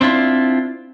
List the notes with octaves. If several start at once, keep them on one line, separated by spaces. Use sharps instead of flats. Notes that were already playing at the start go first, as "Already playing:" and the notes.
C4 D4 E4 F4